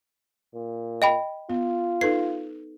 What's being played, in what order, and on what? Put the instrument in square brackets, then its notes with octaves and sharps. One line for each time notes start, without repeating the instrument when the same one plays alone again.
[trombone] A#2
[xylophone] D#5 G5 B5
[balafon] B3 [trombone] F4
[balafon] D#4 A4 B4 [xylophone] C7